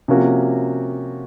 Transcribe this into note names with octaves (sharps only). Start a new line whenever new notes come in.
C3 F3 A#3 C#4 F#4